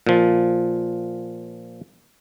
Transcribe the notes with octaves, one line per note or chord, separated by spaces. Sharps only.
A#2 F3